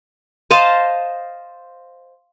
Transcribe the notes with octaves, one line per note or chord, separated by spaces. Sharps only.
C5 D#5 F5 A5